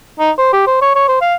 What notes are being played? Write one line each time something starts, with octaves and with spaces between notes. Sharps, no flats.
D#4
C5
G4
C5
C#5
C#5
C5
F5